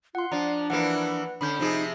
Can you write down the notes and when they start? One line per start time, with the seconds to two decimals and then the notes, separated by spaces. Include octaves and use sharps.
0.15 F4 F#5 C6
0.32 F3 D4 D5 A#5
0.70 E3 F3 A#3 B4 F#5
1.41 D3 C#4 B5 G6
1.59 C3 F3 D#4 G#4